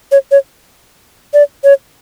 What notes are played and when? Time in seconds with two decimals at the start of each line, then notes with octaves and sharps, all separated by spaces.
0.12 C#5
0.31 C#5
1.34 D5
1.64 C#5